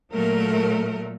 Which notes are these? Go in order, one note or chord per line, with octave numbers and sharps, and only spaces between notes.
A#2 F#3 A3 A#4